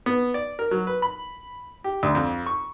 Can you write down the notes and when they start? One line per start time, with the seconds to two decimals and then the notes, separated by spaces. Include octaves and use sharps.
0.06 B3
0.34 D5
0.59 A#4
0.71 F#3
0.87 B4
1.02 B5
1.84 G4
2.03 D2
2.15 F2
2.46 C#6